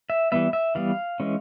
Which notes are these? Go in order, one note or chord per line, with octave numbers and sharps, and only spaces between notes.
E5
E3 G3 B3 E5
E5
E3 G3 B3 F5
E3 G#3 C#4